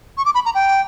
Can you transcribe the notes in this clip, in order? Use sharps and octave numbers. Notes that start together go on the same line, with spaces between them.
C#6
D6
B5
A#5
G5